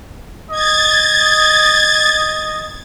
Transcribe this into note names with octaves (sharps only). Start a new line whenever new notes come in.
D#5 G#6 A6